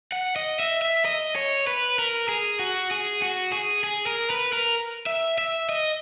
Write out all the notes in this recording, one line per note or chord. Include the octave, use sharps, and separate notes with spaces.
F#5
D#5
E5
E5
D#5
C#5
B4
A#4
G#4
F#4
G#4
F#4
G#4
G#4
A#4
B4
A#4
E5
E5
D#5